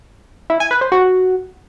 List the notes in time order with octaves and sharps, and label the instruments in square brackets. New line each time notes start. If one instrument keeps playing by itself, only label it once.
[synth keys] E4
G#5
B4
C5
F#4